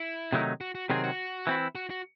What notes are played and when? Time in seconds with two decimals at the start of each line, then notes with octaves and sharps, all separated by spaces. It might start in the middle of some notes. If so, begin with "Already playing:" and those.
Already playing: E4
0.32 C3 D#3 F#3 A3 D#4
0.61 F#4
0.75 F#4
0.90 C3 D#3 F#3 C4 G#4
1.04 F#4
1.47 E3 C4 E4
1.75 F#4
1.90 F#4